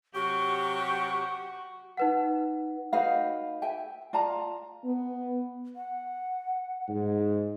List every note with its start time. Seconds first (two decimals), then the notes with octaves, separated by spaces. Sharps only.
0.15 C3 F#3 F#4 G4 C#6
1.97 D#4 B4 F#5
2.93 D#4 F#4 B4 F5
3.62 E5 G5 G#5
4.13 F4 D5 A5 A#5
4.85 B3
5.76 F#5
6.88 G#2